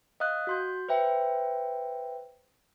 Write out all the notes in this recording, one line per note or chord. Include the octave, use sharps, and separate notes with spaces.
D#5 F5 D#6 F#6
F#4 C6 G6
B4 C5 E5 G5